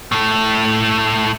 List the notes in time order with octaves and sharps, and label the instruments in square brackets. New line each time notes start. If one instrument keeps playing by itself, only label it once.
[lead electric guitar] A2 A3